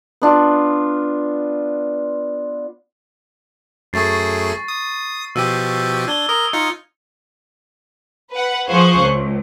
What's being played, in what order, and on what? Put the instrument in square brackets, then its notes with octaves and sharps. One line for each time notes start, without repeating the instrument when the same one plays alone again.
[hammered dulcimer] B3 D4 F4
[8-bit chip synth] F#2 A3 G#4 [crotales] C#6 A6 C7
[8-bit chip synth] D#6
[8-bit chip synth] B2 F3 G4 [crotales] E6 D#7
[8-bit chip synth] D4 [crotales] G#6 G7
[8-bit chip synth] A#4 [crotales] D#6 G7
[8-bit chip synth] D#4 F4 [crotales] C#7
[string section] B4 F#5
F3 G#4 C5 F5 C#6 F#6
C#2